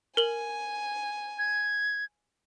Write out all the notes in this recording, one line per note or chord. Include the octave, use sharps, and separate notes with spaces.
A#4 G#5 F#7
G#6